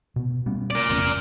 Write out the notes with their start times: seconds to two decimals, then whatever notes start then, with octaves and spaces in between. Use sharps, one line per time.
0.16 B2 B3
0.46 G3 B3 C#4
0.71 A#4 D5
0.89 F1 E2 C#4